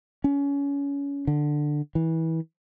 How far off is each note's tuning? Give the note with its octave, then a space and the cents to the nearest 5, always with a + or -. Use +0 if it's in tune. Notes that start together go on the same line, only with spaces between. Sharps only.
C#4 +25
D3 +10
E3 -25